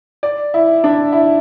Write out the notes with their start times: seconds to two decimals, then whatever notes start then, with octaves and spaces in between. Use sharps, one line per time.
0.23 D5
0.54 E4
0.84 D4
1.12 E4